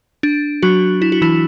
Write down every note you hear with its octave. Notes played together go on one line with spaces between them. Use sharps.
D4
F#3 F#4
E4
F#4
E3 E4